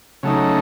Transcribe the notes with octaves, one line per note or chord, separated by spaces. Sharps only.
C#3 F#3 A3 D#4